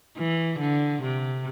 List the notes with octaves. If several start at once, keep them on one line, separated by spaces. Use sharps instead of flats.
E3
D3
C3